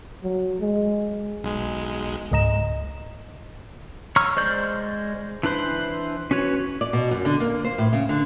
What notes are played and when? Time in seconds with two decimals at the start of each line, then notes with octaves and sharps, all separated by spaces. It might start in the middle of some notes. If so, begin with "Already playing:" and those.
0.23 F#3
0.60 G#3
1.44 B1 G#3
2.32 C#2 G#2 D#5 A#5 E7
4.16 C#5 A#5 C#6 E6 F6
4.36 G#3 C5 D5 G6
5.43 E3 D4 B4 C5
6.31 C#4 F#4 B4 C#5
6.81 D5
6.93 B2
7.11 F#2
7.25 D3
7.40 A#3
7.65 C5
7.78 A2
7.93 C#3
8.09 D3